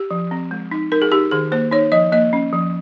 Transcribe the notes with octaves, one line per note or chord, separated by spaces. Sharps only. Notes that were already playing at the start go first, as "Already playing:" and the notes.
Already playing: G4
F3
C4
G#3
D#4
D#4 A#4
G#4
D#4 G4
D#3 G#4
A#3 C5
D#4 C#5
F3 D#5
A#3 D#5
C#4
F3